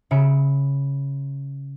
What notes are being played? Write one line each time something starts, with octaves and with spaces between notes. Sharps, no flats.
C#3 E5 B5 C#7 D7